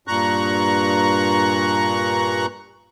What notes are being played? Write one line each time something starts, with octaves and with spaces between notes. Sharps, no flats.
G2 A#2 A#5 C#6 F#6